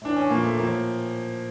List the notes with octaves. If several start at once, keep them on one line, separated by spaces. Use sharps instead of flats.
A2 E3 D4
C#4
A#2 F3 A#3
A3
A2 F3 A#3